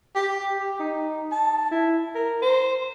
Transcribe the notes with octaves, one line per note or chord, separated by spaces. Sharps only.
G4
G4
D#4
A5
E4
A#4
C5